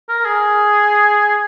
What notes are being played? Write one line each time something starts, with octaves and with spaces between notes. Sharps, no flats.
A#4
G#4